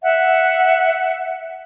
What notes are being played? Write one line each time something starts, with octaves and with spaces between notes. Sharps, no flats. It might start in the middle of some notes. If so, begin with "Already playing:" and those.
E5 F#5